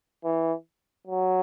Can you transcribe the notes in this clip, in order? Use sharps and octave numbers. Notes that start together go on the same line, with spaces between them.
E3
F#3